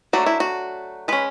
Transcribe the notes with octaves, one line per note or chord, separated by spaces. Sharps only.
F#3 A3 D4 F#4
E4
F#4
G#3 C#4 B4